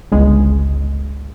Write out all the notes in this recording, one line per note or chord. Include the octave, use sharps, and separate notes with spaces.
G1 C#2 G#3